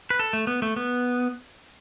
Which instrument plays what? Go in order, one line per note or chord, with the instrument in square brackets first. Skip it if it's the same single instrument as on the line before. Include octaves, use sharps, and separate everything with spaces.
[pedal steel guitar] B4
A4
A3
B3
A3
B3